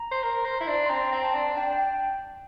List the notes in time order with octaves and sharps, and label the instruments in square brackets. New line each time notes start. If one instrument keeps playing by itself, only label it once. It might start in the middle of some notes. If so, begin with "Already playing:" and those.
Already playing: [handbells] A#5
[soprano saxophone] C5
A#4
C5
E4
D4
[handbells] C6
[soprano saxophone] C4 [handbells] A#5
[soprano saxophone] C4
[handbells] A5
[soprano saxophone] D4
[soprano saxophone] D4 [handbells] G5
[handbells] G5